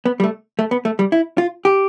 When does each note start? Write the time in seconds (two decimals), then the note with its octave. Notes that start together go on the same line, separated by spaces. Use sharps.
0.06 B3
0.20 G3
0.24 A3
0.59 A3
0.71 B3
0.85 A3
0.99 G3
1.12 E4
1.38 F4
1.65 G4